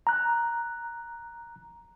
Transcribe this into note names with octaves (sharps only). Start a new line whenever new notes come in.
A#5 F#6